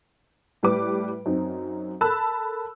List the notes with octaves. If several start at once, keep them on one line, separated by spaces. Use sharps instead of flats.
A2 G3 B4 D6
F#2 C4 D#4
A4 A#4 A5 B5 E6 F#6